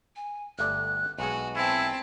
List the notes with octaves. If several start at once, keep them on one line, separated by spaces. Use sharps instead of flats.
G#5
G1 A3 D5 F#6
B1 G#3 F#4 G#5
C4 E4 A5